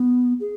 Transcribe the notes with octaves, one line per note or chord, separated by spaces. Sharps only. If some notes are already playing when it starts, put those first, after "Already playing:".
Already playing: B3
G#4